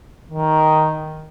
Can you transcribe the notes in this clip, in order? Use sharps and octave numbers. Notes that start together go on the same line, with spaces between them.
D#3